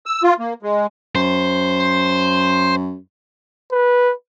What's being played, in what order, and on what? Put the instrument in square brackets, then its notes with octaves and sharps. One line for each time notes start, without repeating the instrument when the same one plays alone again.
[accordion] E6
F4
A#3
G#3
[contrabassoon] F#2 [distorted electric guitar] C5
[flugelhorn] B4